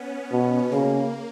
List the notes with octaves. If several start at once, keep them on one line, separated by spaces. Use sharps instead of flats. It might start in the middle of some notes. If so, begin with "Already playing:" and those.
Already playing: B3 C#4
B2
C#3 A#3